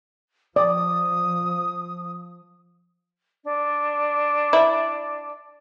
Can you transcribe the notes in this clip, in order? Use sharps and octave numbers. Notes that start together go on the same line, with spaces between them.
F3 D5 D#6
D4
E4